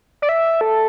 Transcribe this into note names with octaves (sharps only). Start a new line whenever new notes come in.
D5
E5
A4